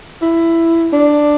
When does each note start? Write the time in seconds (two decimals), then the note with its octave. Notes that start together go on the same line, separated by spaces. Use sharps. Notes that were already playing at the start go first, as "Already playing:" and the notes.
0.22 E4
0.92 D4